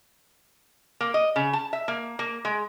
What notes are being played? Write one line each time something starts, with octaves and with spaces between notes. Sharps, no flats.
A#3
D#5
C#3
A5
E5
A#3
A#3
G#3